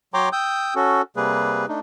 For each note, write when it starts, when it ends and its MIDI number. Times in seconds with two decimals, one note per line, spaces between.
0.14 0.29 54
0.14 0.29 73
0.14 0.29 79
0.14 0.29 82
0.14 0.29 84
0.14 0.29 86
0.33 0.74 79
0.33 0.74 87
0.33 0.74 88
0.33 0.74 91
0.75 1.02 61
0.75 1.02 66
0.75 1.02 69
1.16 1.66 48
1.16 1.66 55
1.16 1.66 58
1.16 1.66 68
1.16 1.66 71
1.68 1.80 57
1.68 1.80 62
1.68 1.80 63